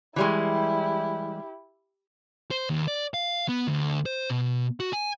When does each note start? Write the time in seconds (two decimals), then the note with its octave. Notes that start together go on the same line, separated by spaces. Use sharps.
0.16 E3 G3 G#3 E4 G4
2.51 C5
2.70 D#2
2.88 D5
3.14 F5
3.49 B3
3.67 D2
4.06 C5
4.30 B2
4.80 F#4
4.93 G#5